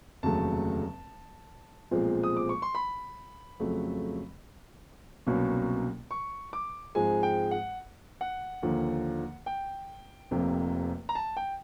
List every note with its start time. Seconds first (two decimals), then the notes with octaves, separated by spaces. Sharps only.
0.23 F1 D#2 C#3 F#3 A3 A5
1.91 B1 A#2 F3 G#3 C4
2.23 D#6
2.37 D6
2.49 C#6
2.62 C6
2.75 B5
3.60 F2 C#3 F#3 A3
5.27 C2 B2 F#3 A#3 C#4
6.11 C#6
6.53 D6
6.95 G#2 F3 G#3 C4 G#5
7.23 G5
7.51 F#5
8.21 F#5
8.62 D#2 D3 F3 A#3
9.46 G5
10.31 F1 F2 C3 F3 A#3
11.09 A#5
11.15 A5
11.37 G5